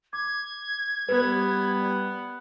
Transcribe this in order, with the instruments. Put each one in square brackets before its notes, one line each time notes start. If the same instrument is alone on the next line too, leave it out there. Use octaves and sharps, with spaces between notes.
[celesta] D6 [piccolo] G#6
[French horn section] G3 [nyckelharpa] B3 [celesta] B4